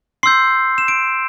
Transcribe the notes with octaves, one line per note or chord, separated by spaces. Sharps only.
C6 E6 G6 C7
E7
D7